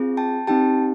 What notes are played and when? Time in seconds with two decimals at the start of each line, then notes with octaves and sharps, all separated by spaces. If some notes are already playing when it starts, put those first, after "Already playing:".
Already playing: C4 F4 G#4
0.17 G5 A5
0.47 C4 D#4 G4 G5 A5